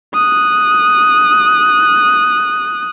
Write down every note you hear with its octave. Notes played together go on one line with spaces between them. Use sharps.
D#6 F#6